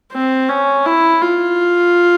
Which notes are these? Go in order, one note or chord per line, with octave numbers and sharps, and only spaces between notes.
C4
C#4
E4
F4